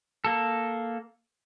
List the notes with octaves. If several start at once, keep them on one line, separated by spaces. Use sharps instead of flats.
A#3 A4